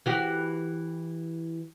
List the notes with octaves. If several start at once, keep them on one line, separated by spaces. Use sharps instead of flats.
E3 F#4 G4